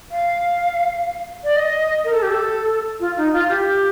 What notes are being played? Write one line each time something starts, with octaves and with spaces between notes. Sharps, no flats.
F5
D5
D#5
A#4
A4
G4
A4
F4
D#4
F4
G4